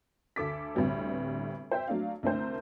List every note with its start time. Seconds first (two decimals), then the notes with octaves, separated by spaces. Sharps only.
0.36 D2 A4 D6 B6
0.75 D2 A2 C3 G3 B3
1.71 C5 E5 G5
1.88 F#3 A3 D4 F5
2.23 C2 D3 A3 A#4 C5